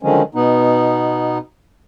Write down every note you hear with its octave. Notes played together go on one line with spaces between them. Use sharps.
D3 D#3 F3 F#3 G#3 C#4
B2 B3 D#4